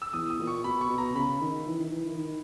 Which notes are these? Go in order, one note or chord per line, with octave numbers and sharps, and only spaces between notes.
E6
E2 D#6
D#6
A#2
C#6
B2 B5
C#6
B2
A#5
C#3 B5
D#3
E3
D#3
E3
D#3
D#3